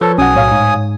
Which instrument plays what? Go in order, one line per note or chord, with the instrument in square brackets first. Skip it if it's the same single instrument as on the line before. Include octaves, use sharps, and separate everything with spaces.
[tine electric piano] F3 B4 C#5 [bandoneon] A4
[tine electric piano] B1 F#4 [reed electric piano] C#4 F#5 [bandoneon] G#5 D#6
[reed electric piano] A2 C#5 F5
[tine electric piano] G#2